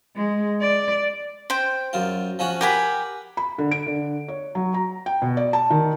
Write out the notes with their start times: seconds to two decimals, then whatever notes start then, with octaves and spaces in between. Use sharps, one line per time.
0.16 G#3
0.60 D5
1.50 C5 G5
1.93 F#2 F4
2.39 F3 C#4 F#4
2.61 G4 A#4 B4 F#5 G#5 B5
3.37 B5
3.58 D3
3.71 D7
3.87 D3
4.28 C#5
4.55 F#3
4.74 A#5
5.06 G5
5.22 B2
5.37 D5
5.53 A5
5.70 D#3